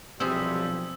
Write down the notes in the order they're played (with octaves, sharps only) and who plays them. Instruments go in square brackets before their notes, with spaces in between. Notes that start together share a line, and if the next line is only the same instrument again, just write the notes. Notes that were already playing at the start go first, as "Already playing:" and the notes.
[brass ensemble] B1 F3 [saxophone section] C3 E3 G3 [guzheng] C4 G#4 [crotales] E6